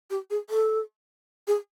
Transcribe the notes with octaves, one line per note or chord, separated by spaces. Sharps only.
G4
G#4
A4
G#4